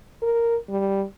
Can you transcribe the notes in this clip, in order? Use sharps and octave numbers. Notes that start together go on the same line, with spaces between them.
A#4
G3